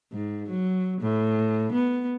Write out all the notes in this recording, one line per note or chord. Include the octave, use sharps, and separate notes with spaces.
G#2
F#3
A2
B3